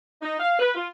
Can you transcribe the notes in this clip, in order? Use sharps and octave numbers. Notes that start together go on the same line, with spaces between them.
D#4
F5
B4
F4